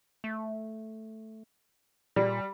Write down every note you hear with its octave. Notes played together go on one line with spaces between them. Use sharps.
A3
A#2 G3